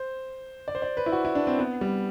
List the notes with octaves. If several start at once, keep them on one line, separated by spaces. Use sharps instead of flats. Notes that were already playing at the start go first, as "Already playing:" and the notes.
Already playing: C5
D5
C5
D5
B4
E4
F#4
E4
D4
C4
B3
G3